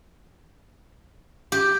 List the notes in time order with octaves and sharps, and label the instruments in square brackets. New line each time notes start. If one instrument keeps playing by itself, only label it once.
[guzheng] G4